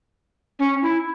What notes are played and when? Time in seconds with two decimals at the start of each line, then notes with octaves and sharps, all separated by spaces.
0.59 C#4
0.82 E4